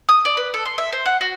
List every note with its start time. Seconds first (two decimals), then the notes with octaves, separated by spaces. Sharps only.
0.09 D#6
0.25 D5
0.37 B4
0.54 A4
0.65 C6
0.78 E5
0.92 C5
1.06 F#5
1.21 F#4